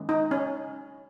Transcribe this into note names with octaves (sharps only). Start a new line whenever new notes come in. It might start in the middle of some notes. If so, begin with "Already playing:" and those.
Already playing: D#3 G#3 C#4
D#4
C#4